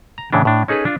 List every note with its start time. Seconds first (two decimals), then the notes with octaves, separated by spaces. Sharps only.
0.18 A#5
0.33 A2 C#3 E3 C#4 D4
0.45 A2 D4
0.68 C#4 D#4 G#4 A4 B4
0.85 D4 F4